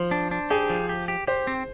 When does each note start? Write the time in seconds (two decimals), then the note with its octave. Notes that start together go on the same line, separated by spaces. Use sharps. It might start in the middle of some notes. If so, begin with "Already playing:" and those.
Already playing: F3 C5
0.11 D4
0.31 D4
0.50 G4 G#4
0.70 F3
0.89 G4
1.08 G4
1.27 G4 C5
1.47 C4